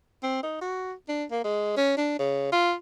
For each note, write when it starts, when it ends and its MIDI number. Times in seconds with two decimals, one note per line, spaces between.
0.23 0.43 60
0.43 0.58 63
0.61 0.93 66
1.09 1.25 62
1.31 1.42 58
1.44 1.75 56
1.77 1.97 61
1.97 2.15 62
2.19 2.49 49
2.52 2.74 65